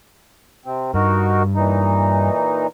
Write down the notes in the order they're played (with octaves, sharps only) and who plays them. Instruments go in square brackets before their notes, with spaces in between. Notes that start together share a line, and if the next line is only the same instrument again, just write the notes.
[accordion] C3 C4
[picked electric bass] G2 [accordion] D#4 F#4 A#4
[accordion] A#2 E3 D#4